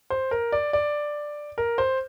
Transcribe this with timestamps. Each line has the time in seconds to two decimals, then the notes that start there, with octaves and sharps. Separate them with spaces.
0.10 C5
0.31 A#4
0.52 D5
0.73 D5
1.58 A#4
1.78 C5